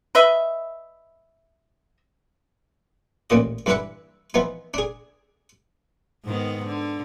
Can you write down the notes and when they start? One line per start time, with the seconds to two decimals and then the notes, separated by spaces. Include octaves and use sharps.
0.15 B4 D#5 E5
3.30 A1 D#2 A#2 D#5
3.66 G2 E3 D4 E4 B4 F#5
4.34 E3 F3 B3 D#4
4.74 D4 G#4
6.25 G#2 D#3 B3
6.65 D3